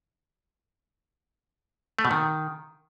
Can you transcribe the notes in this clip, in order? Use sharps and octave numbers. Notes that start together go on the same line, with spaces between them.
A3
B2
D#3